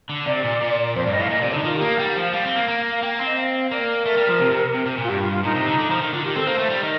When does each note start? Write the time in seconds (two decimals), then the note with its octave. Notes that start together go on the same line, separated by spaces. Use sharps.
0.09 D3
0.26 C3 D5
0.44 A#2
0.61 A#2
0.95 F2 C5
1.04 G2 D5
1.12 D#5
1.18 A2 F5
1.30 A#2 D#5
1.41 C3 D5
1.53 D3 D#4
1.64 D#3 F4
1.76 G4
1.81 A#3
1.88 F5
1.99 G3 G5
2.10 F5
2.16 F3
2.22 F5
2.33 G3 F5
2.45 C4
2.56 A#3
2.68 A#3
2.91 F5
3.02 A#3 G5
3.14 F5
3.19 C4
3.26 D#5
3.37 F5
3.54 F5
3.71 A#3 D5
4.05 A3 A#4
4.17 G3
4.29 F3
4.40 C3
4.52 C3
4.75 C3
4.86 C3
4.97 A#2
5.03 F4
5.09 G2 G4
5.21 F4
5.32 F4
5.44 A#2 D#4
5.55 C3
5.66 D3
5.78 D3
5.90 F3
6.01 D#3
6.13 D3 F4
6.24 D#3 G4
6.35 C4 A4
6.47 A#3 C5
6.58 A3
6.70 G3
6.81 D#3 D#5